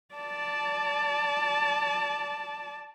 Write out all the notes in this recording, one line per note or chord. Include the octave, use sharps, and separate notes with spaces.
D5 A5